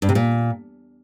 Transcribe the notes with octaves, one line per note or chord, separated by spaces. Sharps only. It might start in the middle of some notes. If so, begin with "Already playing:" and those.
G2
C3
A#2